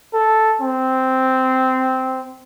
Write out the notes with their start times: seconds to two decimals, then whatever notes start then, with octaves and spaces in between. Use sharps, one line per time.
0.13 A4
0.62 C4